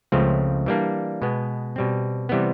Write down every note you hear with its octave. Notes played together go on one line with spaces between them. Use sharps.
C#2 C#3 F3 A3 C4
E3 G3 A#3 D4
B2 G#3 B3
B2 G3 C4
C3 E3 G3 B3